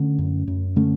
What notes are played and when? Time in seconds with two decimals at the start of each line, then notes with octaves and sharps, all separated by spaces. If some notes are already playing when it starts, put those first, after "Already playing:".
Already playing: D3 A3 C#4
0.19 F#2
0.47 F#2
0.76 D3 A3 C#4